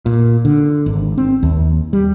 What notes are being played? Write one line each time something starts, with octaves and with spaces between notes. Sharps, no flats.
A#2
D3
G#1
C4
D#2
G3